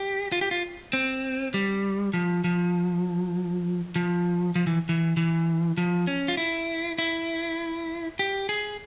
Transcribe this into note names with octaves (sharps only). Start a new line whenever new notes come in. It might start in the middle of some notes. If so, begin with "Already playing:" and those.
Already playing: G4
F4
G4
F4
C4
G3
F3
F3
F3
F3
E3
E3
E3
F3
C#4
F4
E4
E4
G4
G#4